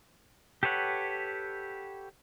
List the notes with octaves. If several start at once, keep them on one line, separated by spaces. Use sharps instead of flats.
G4 A4 B4 C#5 F#5